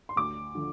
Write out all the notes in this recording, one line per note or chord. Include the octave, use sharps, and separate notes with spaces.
C6
D2 D6
D3 F3